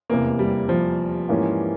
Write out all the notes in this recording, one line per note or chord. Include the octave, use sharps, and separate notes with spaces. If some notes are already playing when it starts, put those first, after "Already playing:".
F1 E2 C3 A#3
G3
F3
G#2 E3 A#3 C#4 G4